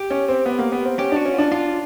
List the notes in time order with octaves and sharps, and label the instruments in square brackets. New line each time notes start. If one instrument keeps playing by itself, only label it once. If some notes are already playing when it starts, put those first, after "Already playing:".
Already playing: [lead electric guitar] G4
[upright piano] C#4
C4
B3
A#3
B3
C4
[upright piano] C#4 [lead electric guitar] G4
[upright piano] D4
[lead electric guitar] F#4
[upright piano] C#4
[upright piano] D4 [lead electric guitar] F4
[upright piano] D4 [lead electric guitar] F4